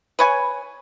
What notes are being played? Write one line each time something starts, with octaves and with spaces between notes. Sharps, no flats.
B4 C#5 G#5